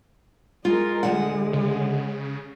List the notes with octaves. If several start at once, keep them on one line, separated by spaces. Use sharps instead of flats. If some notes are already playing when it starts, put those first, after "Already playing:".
G#3 F4 A#4
D2 F3 G#3 F#5
C#3